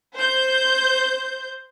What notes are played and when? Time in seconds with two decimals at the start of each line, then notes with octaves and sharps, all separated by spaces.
0.14 C5 G6